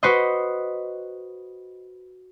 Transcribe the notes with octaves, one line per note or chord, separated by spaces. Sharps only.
F#4 B4 C5 D#5